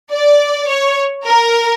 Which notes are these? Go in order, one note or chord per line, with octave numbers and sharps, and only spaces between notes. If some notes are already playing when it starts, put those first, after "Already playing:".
D5
C#5
A#4